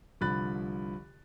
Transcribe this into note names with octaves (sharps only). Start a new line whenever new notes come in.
C2 D3 F3 B5 F#6 A6